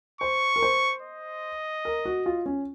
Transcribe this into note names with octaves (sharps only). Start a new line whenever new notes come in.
C5 C#6
A#4
C5
D#5
A#4
F#4
F4
C#4